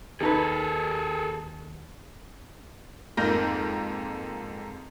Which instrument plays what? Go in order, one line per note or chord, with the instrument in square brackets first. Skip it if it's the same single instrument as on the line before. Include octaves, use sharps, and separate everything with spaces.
[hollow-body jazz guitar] D#2 D#4 B4 [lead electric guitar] G#4 A4
[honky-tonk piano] F2 G#2 A#3 A#4 G6 A#6